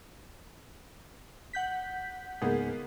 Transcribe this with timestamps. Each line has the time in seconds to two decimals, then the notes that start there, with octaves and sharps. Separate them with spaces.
1.53 F#5 G6 B6
2.42 C#2 G#2 G#3 A#3 B3 G#4